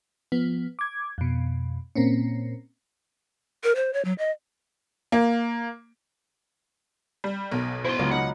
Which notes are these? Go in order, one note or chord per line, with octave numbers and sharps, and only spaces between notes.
F3 B3
D6 G#6
F2 B2
A#2 A#3 C4 C#4
A#4
C5
C#5
F#3
D#5
A#3
G3
B1 B2 A#4
E4 C5 C6
C#2 F#3 B3 F5
D#4 B4 F#5